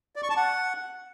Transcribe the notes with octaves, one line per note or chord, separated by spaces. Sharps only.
D5
C#6
A5
F#5